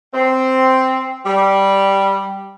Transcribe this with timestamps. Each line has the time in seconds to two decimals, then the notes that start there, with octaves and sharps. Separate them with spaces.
0.14 C4
1.25 G3